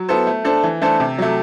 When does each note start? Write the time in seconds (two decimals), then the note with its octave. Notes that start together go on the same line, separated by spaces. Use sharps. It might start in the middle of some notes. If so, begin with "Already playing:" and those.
Already playing: F#3
0.09 B3 E4 A4 C5
0.27 A3
0.45 D4 A4 C5
0.64 E3
0.82 A3 D4 A4 C5
1.00 C3
1.18 F#3 A3